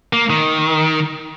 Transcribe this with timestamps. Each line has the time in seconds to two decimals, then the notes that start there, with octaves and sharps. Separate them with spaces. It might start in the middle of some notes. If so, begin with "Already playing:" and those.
0.13 A#3
0.30 D#3